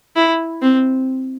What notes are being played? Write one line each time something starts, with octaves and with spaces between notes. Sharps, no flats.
E4
C4